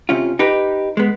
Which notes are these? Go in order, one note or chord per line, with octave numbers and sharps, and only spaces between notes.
C3 C#4 F4
D#4 G4 B4
G#3 B3